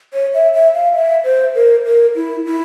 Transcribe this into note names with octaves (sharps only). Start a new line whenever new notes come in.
C#5
E5
E5
F5
E5
C5
A#4
A#4
E4
E4